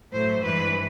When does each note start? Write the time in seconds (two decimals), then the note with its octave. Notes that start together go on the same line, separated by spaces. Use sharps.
0.13 A2 F#3 A3 C5
0.43 G2 E3 G#3 B4